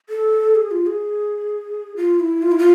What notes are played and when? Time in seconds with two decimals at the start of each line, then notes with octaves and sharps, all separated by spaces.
0.09 A4
0.55 G#4
0.71 F4
0.86 G#4
1.96 F4
2.20 E4
2.42 F4
2.52 E4
2.58 F4